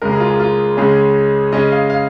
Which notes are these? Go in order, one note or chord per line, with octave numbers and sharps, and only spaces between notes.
C#2 C#3 G#3 A#4
G#4
F4
G#4
F4
C#2 C#3 G#3 C#4 G#4
C#3 G#3 C#4 D#5
F5
F5